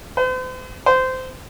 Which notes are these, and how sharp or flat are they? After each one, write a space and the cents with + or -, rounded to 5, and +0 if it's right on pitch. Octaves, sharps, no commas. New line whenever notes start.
C5 -45
C5 -20